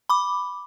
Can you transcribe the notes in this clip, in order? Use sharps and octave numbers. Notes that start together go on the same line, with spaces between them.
B5 D6